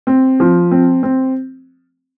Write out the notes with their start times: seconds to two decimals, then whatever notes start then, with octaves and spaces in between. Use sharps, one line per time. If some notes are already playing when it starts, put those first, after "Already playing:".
0.07 C4
0.40 F3
0.71 C4
1.03 C4